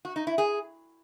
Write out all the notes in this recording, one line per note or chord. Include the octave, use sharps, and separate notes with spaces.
F#4
D#4
E4
G#4